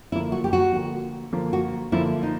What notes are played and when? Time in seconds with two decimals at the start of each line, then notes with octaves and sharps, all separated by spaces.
0.12 D3 F3 A#3 E4
0.32 F#4
0.44 G4
0.53 F#4
0.73 D3 F3 A#3
1.33 D3 F3 A#3
1.53 F#4
1.92 D3 F3 A#3 E4
2.23 D#4